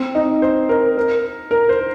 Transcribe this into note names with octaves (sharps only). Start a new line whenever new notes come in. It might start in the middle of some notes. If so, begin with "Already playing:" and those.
Already playing: C4
D#4
C5
A#4
A#4
A#4
C5